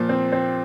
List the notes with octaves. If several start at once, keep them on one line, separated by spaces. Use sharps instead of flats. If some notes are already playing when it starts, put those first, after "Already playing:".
Already playing: A#2 F3
C4
C4